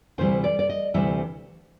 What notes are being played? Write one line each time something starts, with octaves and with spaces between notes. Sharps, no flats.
D2 C3 E3 G3 C5
D5
D5
D#5
D2 C3 E3 G3 E5